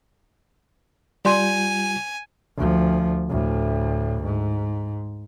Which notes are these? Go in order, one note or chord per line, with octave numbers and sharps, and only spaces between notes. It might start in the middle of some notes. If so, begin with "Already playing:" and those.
G3 F4 D5 G#5 C6 G6
D2 F3
D2 A2
G#2